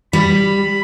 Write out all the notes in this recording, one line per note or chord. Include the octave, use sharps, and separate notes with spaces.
G3 B5